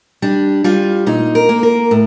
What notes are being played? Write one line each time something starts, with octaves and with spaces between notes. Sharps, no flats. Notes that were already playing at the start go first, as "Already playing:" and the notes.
G3 D4
G3 F4
A#2 D#4
A#4
A#3
A#4
A2